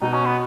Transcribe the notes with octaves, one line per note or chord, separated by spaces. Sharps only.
B2 D#4
C#4
B3